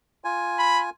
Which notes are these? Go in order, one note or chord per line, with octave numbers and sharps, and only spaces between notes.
F4 G#5
B5